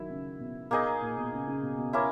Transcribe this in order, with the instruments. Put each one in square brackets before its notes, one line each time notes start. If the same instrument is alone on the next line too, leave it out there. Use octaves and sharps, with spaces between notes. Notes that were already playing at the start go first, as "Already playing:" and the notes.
Already playing: [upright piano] D#3 F#3 [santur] E4
[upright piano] C#3
B2
[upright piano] B2 [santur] A#3 D#4 G#4 D#5
[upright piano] A#2
B2
C#3
C#3
B2
B2
[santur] A#3 C#4 E4